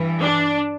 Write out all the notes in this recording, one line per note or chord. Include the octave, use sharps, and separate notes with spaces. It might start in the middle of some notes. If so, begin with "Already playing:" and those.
Already playing: G2 E3
D4